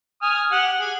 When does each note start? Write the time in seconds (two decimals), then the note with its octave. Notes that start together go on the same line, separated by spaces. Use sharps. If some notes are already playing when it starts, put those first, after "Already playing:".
0.22 G#5 D#6 F6
0.52 G4 F#5
0.80 G#4